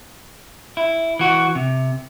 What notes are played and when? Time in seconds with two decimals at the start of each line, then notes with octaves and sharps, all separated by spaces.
0.77 E4
1.19 E3 F#4
1.55 C3